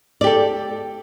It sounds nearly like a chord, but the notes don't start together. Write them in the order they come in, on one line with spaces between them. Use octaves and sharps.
D5 G4 A4